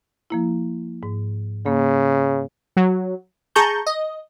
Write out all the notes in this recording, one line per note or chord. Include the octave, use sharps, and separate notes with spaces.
F3 A#3 E4
G#2
C#3 A#3
F#3
G#4 A5 A#5 C#6 G6
D#5